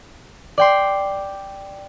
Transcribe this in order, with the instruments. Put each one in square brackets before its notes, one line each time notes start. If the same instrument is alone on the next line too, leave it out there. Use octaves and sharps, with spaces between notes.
[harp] D5 G5 C6